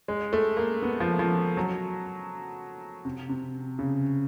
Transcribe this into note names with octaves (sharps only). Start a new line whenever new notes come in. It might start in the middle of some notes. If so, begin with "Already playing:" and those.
G#3
A3
A#3
B3
F3
F3
F#3
C3
C3
C#3